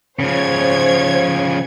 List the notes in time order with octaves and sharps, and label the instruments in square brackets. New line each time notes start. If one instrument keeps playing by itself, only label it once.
[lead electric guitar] C#3 F3 [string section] C5 C#5 G#6